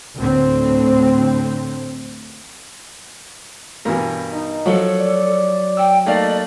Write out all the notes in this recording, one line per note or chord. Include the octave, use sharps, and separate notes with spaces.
D2 A2 D3 C4
G2 B2 E3 A#4
D#4
F3 F#3 A4
D5
G5 E6
A3 A#3 D#4 D5